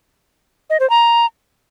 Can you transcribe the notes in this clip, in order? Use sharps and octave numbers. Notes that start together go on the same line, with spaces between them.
D#5
C5
A#5